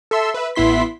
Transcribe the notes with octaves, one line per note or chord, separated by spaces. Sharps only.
A4 E5 C6 E6
B4 E5
A1 B3 E4 C6 B6